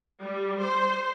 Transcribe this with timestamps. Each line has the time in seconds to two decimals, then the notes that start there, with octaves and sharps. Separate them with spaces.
0.23 G3
0.63 C5